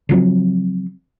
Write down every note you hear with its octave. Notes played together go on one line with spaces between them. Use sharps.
C#3 F3 F#3 C4